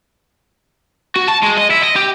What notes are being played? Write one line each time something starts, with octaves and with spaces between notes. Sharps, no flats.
F#4
A5
G#3
D#5
E4
D#5
G4